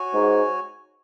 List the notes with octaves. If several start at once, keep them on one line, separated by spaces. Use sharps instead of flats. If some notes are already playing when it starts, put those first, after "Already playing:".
Already playing: F#4 C#5 G#5
G#2